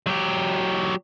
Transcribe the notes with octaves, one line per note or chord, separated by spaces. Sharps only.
F#3 G4